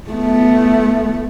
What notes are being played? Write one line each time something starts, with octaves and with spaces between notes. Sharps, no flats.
A3 B3